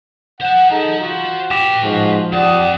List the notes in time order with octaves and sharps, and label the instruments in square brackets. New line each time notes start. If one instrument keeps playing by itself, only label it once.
[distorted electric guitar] C5 A5 [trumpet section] F#5
[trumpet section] D#4 G#4 A4
F4 F#4
[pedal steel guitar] G4 [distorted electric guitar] B4 A5
[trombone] G#2 [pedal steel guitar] F3 [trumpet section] F#4
[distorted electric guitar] F2 A5 [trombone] D4 [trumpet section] G4 F#5 D#6